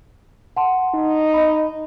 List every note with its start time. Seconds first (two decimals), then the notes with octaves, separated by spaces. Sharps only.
0.56 F#5 A5 C6
0.95 D#4
1.34 D#5 B5